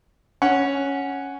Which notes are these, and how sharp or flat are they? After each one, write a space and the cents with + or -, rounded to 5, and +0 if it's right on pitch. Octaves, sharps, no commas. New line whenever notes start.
C#4 +0 F#5 +0